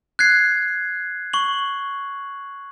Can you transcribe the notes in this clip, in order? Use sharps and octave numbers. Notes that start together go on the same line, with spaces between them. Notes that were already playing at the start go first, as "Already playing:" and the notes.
F#6 G#6 C7
C#6 F#7